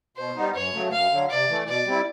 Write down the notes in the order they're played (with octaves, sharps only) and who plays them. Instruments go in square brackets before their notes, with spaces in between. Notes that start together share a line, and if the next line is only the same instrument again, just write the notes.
[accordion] B2 [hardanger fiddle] C5
[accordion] G3 B3 D#4
[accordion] F#2 [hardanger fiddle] C#5
[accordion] C#3 F#3 A3
[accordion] F#2 [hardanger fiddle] F5
[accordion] D3 F#3
[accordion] C3 [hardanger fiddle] D5
[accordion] E3 A3
[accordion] B2 [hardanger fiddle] D5
[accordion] G3 C4 E4